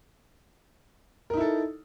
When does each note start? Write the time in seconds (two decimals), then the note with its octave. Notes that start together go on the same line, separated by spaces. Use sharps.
1.30 A#4
1.34 D#4
1.37 E4
1.41 A4